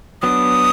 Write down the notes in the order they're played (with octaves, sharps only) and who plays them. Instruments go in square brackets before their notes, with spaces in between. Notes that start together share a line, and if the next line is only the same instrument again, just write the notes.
[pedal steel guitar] F#3 B3 D4 [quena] D#6